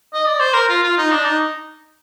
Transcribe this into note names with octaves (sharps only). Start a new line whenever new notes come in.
D#5
D5
C5
A#4
F4
F4
D#4
D4
D#4